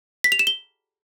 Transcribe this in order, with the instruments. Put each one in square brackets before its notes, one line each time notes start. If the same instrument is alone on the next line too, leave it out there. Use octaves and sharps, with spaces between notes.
[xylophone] B6
F7
E7
G7